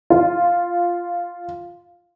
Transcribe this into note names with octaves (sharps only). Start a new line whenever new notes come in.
F4